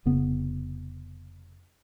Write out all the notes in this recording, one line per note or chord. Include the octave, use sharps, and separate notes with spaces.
F1 C#3 B3